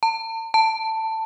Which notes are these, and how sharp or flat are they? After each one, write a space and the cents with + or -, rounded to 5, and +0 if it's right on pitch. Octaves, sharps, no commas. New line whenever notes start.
A5 +40
A5 +15